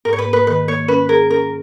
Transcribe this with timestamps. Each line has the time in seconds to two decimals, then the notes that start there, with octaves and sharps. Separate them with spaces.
0.05 G#2 A#4
0.13 C#5
0.19 B4
0.25 A#3
0.33 B4
0.47 D#3 B4
0.68 A#3 C#5
0.88 C#4 B4
1.09 G#4 A#4
1.30 C#4 A#4